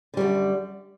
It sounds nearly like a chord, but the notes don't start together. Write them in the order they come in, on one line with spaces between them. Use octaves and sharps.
D3 G3 F#2